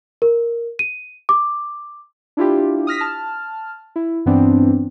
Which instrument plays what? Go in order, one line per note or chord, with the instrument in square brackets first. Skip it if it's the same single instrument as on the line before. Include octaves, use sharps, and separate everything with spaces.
[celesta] A#4
D#7
D6
[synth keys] D4 E4 F4 G4
D#6 F6 A#6 B6
A5 F6
E4
G2 E3 B3 C4 D4